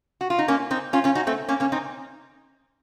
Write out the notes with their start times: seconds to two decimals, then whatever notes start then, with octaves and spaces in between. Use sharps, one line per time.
0.21 F#4
0.30 F4
0.39 D#4
0.48 A#3 C#4
0.70 C4 D#4
0.93 C#4 F4
1.04 C#4 F4
1.15 D#4 F#4
1.27 A3 C4
1.48 A#3 C#4
1.60 A#3 C#4
1.72 C4 D#4